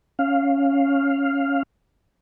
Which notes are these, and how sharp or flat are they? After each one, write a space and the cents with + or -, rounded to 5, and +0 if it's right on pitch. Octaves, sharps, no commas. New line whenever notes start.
C#4 +0 F5 +0